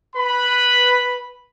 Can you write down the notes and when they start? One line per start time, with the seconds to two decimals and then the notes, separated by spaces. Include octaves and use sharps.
0.16 B4 B5